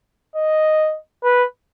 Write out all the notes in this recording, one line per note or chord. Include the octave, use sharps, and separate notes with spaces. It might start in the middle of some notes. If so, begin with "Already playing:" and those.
D#5
B4